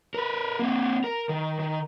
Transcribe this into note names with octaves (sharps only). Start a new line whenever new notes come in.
A#4 B4
A#3 C4
A#4
D#3
D#3